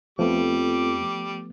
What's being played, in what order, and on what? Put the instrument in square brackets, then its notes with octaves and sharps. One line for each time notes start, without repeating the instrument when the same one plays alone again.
[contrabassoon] F2 [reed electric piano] F3 A3 B3 [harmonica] G3 D6